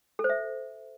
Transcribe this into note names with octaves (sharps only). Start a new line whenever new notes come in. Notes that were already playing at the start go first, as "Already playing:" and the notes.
A4
C5
E5